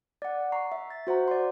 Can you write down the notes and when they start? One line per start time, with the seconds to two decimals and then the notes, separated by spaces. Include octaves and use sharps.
0.22 D5 F#5
0.52 A#5 C#6 C7
0.72 E5
0.90 A6
1.07 F#4 C5 F#5 A#5
1.28 D5 C6